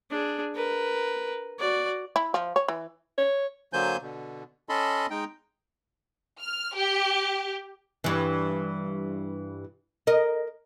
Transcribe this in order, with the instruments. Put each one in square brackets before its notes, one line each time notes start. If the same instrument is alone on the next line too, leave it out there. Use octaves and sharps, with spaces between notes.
[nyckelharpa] D4 G#4
A#4 B4
F#4 D5
[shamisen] E4
F3
C#5
E3
[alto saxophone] C#5
[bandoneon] D3 F#3 A#3 C5 G#5 G6
B2 D3
C#4 A4 D#5 A5 B5 C6
G#3 D#4 G5
[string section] F6
G4
[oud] G2 E3
A#4 D#5